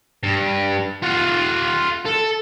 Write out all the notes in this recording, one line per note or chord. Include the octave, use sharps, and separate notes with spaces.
G2
F4 F#5
A4